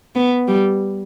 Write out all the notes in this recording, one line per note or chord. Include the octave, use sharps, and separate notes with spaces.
B3
G3